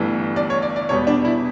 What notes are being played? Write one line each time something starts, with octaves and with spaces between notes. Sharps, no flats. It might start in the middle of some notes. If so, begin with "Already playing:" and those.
Already playing: G1 G2 E3 A3
D5
C#5
D5
D5
E2 B2 G3 B3 C#5
D4
E4